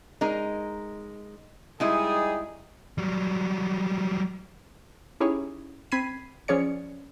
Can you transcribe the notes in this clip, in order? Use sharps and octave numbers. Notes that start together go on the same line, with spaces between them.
G#3 D#4 A#4
G3 G#3 D#4 E4 G#4 D#5
F#3 G3
C#4 D#4 E4 G4 G#4 C#5
C4 B5 G#6 B6 C7 D#7
F3 C#4 G#4 C#5 D5 C#7